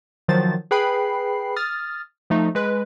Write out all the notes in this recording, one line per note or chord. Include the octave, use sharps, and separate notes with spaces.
D#3 F3 F#3 C5 A6
G#4 B4 G5 B5 C7
D#6 F6 A6
F3 A3 D#4
G#3 B4